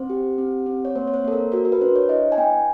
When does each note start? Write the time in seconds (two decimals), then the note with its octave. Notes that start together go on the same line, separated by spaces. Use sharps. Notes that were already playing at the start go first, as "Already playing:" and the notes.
Already playing: C4 C5
0.10 G4
0.38 C4
0.66 C4
0.85 C#5
0.95 A#3 C5
1.07 C#5
1.14 C5
1.24 A#3 A4
1.33 A#4
1.52 F#4 A#4
1.65 A#4
1.72 B4
1.81 D4 C5
1.96 C#5
2.09 E4 D#5
2.32 G#5
2.38 B3 G5